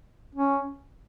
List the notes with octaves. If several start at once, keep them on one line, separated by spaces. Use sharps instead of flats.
C#4